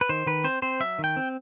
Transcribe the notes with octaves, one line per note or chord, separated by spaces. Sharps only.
B4
D#3 C5
D#3 B4
C4 C5
C4 C5
F#3 E5
D#3
G5
C4